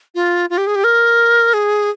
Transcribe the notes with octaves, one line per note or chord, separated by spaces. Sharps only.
F4
F4
G4
G#4
G4
A#4
G#4